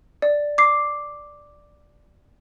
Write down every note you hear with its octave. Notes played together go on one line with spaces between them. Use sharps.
D5
D6 C7